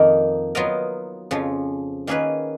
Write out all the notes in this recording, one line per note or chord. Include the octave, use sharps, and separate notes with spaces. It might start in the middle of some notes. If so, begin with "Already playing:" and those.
Already playing: F2 D#3 A#3 D#4 A#4
F#3 B3 F4 A#4 D#5
F2 C#3 F3
D#3 A#3 C#4 G#4 B4